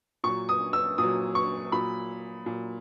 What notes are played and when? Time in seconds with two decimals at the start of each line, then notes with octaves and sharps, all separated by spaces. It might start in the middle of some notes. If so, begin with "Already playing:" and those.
0.24 A#2 F#3 C#6
0.49 D#6
0.73 E6
0.98 A#2 F#3 D#6
1.35 C#6
1.72 A#2 F#3 B5
2.46 A#2 F#3